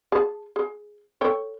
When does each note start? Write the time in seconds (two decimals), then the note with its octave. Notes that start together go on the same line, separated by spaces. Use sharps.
0.12 G#4 A5
0.56 G#4
1.21 A4 C#5 G5